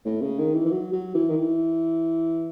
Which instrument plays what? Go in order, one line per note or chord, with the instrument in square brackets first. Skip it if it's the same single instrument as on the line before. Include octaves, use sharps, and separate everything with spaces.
[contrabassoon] A2
C#3
D#3
E3
E3
F#3
F#3
E3
D#3
E3